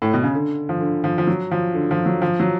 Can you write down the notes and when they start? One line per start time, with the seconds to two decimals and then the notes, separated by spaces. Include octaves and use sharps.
0.02 A2
0.14 B2
0.23 C#3
0.35 D3
0.69 F3
0.80 D3
1.04 F3
1.18 F3
1.27 F#3
1.51 F3
1.74 D3
1.91 F3
2.06 F#3
2.22 F3
2.40 F#3